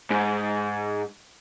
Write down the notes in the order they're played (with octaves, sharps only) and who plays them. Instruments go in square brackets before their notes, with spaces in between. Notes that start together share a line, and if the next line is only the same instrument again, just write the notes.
[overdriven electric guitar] G#2